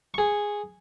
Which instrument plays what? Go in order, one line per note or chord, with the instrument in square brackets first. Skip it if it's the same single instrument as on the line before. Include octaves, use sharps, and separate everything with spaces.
[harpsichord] G#4 C#6